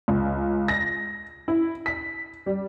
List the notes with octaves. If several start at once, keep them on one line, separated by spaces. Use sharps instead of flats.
C#2
A#6
E4
B6
G3